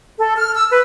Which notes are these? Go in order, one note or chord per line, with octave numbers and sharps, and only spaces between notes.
A4
F6
E6
B4